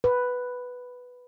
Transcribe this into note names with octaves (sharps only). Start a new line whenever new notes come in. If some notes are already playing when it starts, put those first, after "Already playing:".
B4